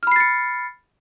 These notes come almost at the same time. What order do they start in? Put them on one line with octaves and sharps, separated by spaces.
F6 B5 C7 A6 C#7